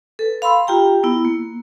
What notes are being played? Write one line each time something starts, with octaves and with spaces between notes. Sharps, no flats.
A4 B4
F5 B5 C6 E6
F4 G4 G5 A#5
B3 E4
A#3